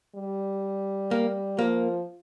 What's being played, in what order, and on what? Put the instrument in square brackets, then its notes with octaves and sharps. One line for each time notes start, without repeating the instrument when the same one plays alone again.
[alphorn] G3
[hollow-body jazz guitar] A#3
[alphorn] F3 [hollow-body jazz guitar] A#3